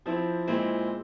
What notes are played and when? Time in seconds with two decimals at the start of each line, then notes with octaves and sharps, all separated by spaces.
0.06 F3 C4 E4
0.47 A#2 G#3 C4 E4